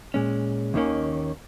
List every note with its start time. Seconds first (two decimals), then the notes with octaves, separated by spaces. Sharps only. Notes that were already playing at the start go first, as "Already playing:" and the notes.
0.14 A#2 G#3 C#4
0.74 D#2 D#3 A#3 C#4